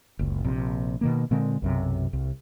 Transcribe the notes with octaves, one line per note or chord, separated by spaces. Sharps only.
F#1 C#2
A#1 C3
B2 D#3 A#3
A#2 D3 G#3 C4
B1 F#2 C3
C2